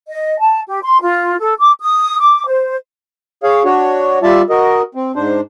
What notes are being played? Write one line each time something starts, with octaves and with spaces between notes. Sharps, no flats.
D#5
A5
G4
C6
F4
A4
D6
D#6
D6
C5
G#4 C#5 F5
D4 F#4 C#5
G3 F4 D5 E5 A5
F#4 A#4 D#5
C4
G#2 D4 C5